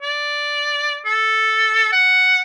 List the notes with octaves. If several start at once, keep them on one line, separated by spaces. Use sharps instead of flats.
D5
A4
F#5